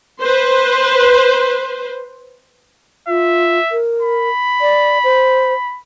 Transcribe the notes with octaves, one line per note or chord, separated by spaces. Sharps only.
B4 C5
F4 E5
A#4
B5
D5
C5